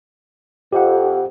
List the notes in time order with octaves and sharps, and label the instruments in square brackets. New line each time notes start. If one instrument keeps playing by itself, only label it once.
[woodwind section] F2 [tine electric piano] G4 F#5